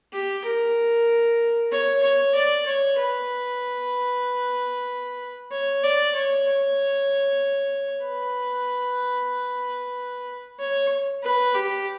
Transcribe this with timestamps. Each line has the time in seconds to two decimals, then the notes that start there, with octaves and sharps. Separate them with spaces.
0.13 G4
0.44 A#4
1.71 C#5
2.03 C#5
2.35 D5
2.66 C#5
2.98 B4
5.52 C#5
5.83 D5
6.15 C#5
6.47 C#5
8.05 B4
10.60 C#5
11.23 B4
11.55 G4